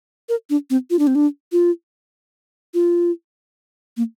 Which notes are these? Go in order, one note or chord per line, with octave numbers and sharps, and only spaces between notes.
A#4
D4
C4
F4
D4
C4
D4
F4
F4
A#3